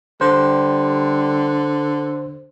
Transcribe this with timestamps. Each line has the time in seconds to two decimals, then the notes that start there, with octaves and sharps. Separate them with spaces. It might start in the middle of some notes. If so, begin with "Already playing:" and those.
0.21 D3 G3 C5